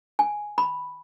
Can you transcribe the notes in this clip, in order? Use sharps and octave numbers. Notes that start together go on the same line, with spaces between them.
G#5
B5